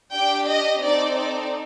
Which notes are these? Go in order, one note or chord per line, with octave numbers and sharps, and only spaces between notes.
D4 G4 G5
D#5
C4 D#4 A4 D5
D5